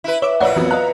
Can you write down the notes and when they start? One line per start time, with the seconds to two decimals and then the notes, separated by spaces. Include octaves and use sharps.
0.04 E4 B4
0.22 C#5 E5 D6
0.40 A#1 A#2 E4 B4 C#5 D5 F#5
0.56 F2 E3 F#3 B3
0.71 D#5 F5 A#5 F#6